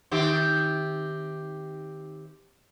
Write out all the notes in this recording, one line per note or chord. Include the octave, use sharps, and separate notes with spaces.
D#3 C4 G4